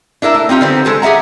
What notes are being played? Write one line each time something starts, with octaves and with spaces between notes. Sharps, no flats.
D4 E4 A#4 E5
A3
C4 D#4 F4 G4
D3 D#3 G3 B3 C4
G#3 A4 C5
G4 G#4 E5 F#5 A#5